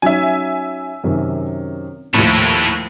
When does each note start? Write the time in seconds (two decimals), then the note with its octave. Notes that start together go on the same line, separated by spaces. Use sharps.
0.02 F#3 C#4 D#4 E5 G#5
1.04 F#2 C3 D#3
2.14 D#2 A2 F3 A3 E4